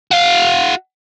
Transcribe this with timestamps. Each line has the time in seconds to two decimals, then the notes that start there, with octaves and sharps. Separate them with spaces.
0.11 F#4 F5